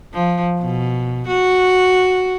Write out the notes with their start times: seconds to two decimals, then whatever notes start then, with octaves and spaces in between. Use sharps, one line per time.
0.13 F3
0.60 B2
1.28 F#4